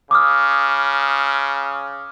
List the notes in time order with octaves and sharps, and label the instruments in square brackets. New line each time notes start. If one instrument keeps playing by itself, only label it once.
[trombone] C#3 [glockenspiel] D6 D#6 F6